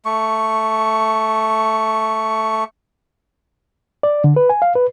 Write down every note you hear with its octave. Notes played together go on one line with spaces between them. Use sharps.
A3 C#6
D5
D3
B4
G#5
F5
B4